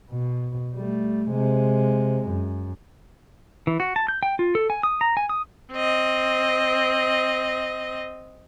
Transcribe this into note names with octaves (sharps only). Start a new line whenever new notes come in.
B2
G3 A3
C3 G#3
F#2
E3
F#4
A5
G6
G5
F4
A4
G#5
D#6
A#5
G#5
D#6
C4 D#5